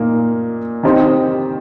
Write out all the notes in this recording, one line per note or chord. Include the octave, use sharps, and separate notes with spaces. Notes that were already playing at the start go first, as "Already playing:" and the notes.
Already playing: A#2 A#3 D#4
D#3 C4 D#4 G4 C5